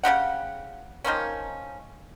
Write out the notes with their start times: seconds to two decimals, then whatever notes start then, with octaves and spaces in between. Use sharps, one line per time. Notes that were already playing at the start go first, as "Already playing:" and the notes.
0.04 C#3 D#4 G4 F#5
1.04 D#3 F3 A#3 C#4